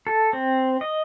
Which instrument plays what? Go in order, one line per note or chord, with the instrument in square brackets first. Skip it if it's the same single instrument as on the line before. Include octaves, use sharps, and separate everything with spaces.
[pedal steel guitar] A4
C4
D#5